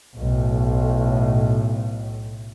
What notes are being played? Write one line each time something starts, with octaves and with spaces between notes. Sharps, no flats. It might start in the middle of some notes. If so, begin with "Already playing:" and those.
B1 A2